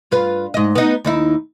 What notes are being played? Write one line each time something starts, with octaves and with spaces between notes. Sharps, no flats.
G2 F4 B4
G#2 D#5
B3 D#4
D#2 D#4 E4